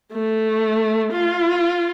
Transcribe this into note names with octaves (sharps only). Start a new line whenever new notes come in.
A3
F4